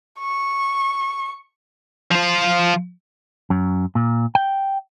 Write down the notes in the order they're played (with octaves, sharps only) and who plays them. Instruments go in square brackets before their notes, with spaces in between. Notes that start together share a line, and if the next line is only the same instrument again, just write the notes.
[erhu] C#6
[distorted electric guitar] F3 F4
[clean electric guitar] F#2
A#2
G5